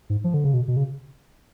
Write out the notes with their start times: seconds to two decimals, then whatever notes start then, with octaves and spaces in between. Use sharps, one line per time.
0.10 G#2
0.24 F3
0.34 D3
0.44 C#3
0.54 B2
0.68 B2
0.77 C#3